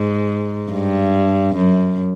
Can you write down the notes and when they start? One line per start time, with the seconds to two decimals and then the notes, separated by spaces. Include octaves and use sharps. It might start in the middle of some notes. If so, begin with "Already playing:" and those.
Already playing: G#2
0.71 G2
1.56 F#2